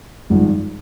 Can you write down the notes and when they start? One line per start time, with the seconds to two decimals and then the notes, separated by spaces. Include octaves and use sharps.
0.30 G#1 G2 F3 G#3